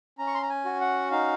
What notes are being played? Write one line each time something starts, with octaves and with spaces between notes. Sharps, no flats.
C#4 A#5
C#6
C6
A#5
G#5
F#4
F#5
D#4 F5